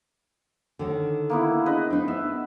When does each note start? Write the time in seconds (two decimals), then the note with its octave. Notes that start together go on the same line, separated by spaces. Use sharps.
0.79 D3 D#3 C#4
1.30 A#3 B3 E4
1.66 D4 G#4 B4 D#5
1.90 C4 D4 D#4
2.08 B3 E5